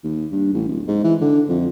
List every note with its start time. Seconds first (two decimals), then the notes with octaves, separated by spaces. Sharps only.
0.04 D#2
0.32 G2
0.54 A1
0.68 D1
0.88 G#2
1.04 E3
1.21 D3
1.49 F2